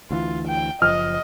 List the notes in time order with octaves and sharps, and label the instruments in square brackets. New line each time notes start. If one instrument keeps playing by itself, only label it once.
[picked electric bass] D2 E3 [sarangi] F4
[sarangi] G5
[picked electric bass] F#1 F3 [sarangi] D#5 [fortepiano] F6